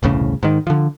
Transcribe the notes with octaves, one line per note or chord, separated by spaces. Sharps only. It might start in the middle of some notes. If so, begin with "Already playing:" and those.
E1 C2 A2 C#3
G#2 D#3
D3 F3